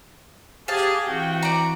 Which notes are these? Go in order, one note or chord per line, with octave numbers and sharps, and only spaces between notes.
G4 G#4 F5 A5
E3 C4 F#4 G5
D5 A#5